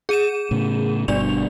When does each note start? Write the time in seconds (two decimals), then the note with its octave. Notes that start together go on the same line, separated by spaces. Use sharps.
0.09 G#4 D#7 E7
0.51 A2 C#3
1.08 G1 G2 B2 D4 D5 F7